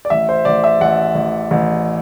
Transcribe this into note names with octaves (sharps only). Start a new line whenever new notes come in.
D5
A1 E5
C5
A1 D5
E5
A1 F#5
A1
A1